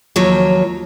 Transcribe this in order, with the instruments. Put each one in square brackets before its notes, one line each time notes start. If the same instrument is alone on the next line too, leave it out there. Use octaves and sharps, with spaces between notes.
[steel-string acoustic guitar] D#2 F3 F#3 C#5